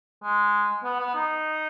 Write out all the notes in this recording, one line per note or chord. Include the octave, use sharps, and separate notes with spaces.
G#3
B3
B3
D#4